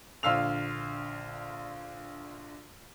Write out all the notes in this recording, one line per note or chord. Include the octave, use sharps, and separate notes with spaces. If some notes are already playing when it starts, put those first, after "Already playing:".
A#1 D3 F5 E6 F7